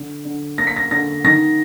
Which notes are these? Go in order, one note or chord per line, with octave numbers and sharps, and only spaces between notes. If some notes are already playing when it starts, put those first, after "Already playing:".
Already playing: D3
D3
A#3 A#6
B6
A#6
D3 A#6
D#3 A#6